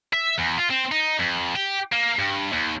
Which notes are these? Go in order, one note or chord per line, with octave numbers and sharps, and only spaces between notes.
E5
E2
F4
C4
D#4
F2
G4
A#3
G2
D#2